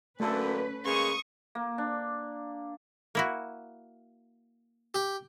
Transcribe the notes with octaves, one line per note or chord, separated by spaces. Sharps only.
F#2 D3 A3 A#3 C#4 A4 B4
C#3 G#3 A#3 C#6 D#6
A#3
D4
A#3 E4 F#4
G4